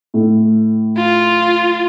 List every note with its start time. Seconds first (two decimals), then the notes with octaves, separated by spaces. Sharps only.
0.14 A2
0.97 F4